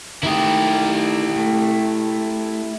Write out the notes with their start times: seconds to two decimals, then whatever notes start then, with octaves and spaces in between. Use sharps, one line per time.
0.23 D#3 A3 E4 G4 D#6
1.36 A3